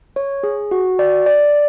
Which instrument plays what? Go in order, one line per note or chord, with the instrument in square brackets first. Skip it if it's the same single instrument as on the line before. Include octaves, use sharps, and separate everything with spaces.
[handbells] C#5
G#4
F#4
D5
D5